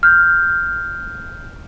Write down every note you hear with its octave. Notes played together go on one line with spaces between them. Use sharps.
F6 G6